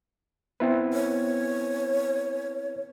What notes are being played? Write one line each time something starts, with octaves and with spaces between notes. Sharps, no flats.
B3 C4 E4 B4
C#5